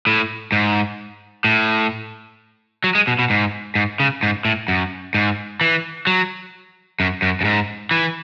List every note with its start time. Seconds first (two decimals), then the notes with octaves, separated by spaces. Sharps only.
0.07 A2
0.52 G#2
1.44 A2
2.84 F#3
2.95 G#3
3.07 B2
3.19 B2
3.30 G#2
3.75 G#2
4.00 C#3
4.23 G#2
4.45 A2
4.68 F#2
5.14 G#2
5.61 E3
6.07 F#3
7.00 F#2
7.22 F#2
7.41 F#2
7.45 G#2
7.91 E3